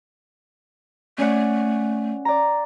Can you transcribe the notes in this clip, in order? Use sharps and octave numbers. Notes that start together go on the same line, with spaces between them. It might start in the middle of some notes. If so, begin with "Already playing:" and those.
A3 C#4 D5 F#5
D5 A#5